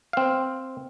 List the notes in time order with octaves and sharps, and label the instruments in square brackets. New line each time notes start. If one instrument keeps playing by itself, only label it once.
[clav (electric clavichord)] C4 F5